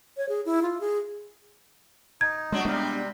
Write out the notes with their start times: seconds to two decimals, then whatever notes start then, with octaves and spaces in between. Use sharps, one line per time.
0.17 C#5
0.29 G#4
0.46 E4
0.62 F4
0.80 G#4
2.21 D#4 G#6
2.52 F#3 G#3 D4 F#4
2.65 C3 G3 G#3 B3 D4